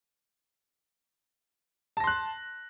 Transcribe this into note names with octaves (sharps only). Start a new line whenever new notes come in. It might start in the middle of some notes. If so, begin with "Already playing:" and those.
A5 C6 F#6 A#6